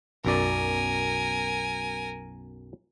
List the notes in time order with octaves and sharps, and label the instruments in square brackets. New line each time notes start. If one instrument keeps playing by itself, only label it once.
[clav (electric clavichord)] B1 F#2 D5 [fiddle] A#4 G#5